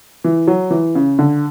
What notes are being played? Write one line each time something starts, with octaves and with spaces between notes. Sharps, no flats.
E3
F#3
E3
C#3
D3